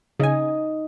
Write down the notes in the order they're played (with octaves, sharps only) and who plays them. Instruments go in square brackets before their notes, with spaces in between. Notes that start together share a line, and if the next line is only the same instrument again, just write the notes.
[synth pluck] C#3 G#5 [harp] D#4 D#5